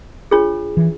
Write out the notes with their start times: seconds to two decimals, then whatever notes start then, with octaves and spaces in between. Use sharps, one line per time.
0.31 D4 F4 G#4 C#5
0.77 E3